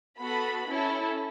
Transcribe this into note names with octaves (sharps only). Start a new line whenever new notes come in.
B3 F#4 A4 B5
C#4 E4 A4